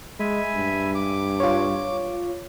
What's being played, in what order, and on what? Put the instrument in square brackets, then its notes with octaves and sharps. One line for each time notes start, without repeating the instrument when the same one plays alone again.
[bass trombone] G#3 [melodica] E5 G#5 B5
[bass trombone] G2
[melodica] D6
[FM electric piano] F4 C#5